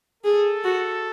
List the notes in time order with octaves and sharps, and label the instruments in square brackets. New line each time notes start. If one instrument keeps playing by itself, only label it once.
[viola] G#4 [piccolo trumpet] A4
[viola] F#4